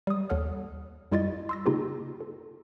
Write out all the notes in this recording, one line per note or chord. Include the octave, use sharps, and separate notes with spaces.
G3 D#6
D#2 A4 C#5 F#5 F6
F#2 G3 E4 F4 D#5 A6
C6 E6 A#6
C#3 A#3 D#4 F4 G4 G#4
A4